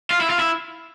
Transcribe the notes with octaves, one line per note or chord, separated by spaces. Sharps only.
F4
E4
F4
E4